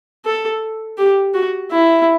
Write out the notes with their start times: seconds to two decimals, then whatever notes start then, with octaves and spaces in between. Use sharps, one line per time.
0.25 A4
0.98 G4
1.34 F#4
1.71 E4